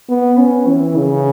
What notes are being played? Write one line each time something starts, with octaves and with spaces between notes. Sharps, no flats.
B3
C#4
E3
C#3